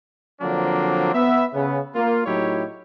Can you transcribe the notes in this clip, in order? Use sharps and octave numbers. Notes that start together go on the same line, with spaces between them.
D3 F3 F#3 A#3 C4 D4
B3 E5
C#3 B3
A#3 F4
A2 F#3 D#4 E4 G4 C#5